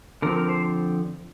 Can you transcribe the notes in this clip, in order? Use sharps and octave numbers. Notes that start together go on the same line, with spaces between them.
D3 F3 C4 A#4
A#4
C5